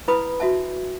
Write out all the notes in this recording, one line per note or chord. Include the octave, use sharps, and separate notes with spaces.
E4 B4 B5 D#6
F#4 E5 A5